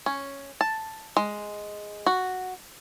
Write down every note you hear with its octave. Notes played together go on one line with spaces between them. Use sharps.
C#4
A5
G#3
F#4